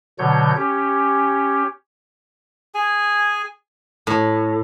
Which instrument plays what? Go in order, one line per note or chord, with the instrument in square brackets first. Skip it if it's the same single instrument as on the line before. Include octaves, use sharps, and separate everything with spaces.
[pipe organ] B2 D3 F#3 C#5 G6
C#4 G4
[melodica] G#4 G#5
[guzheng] A2